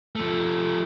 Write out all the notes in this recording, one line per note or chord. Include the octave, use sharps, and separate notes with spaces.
F3 A3